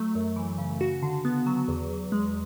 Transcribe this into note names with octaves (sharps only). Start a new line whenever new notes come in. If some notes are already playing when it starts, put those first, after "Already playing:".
Already playing: F#3 A3
F#2
E3
C#3
F#4
D3
B3
F#3
E2
E2
G#3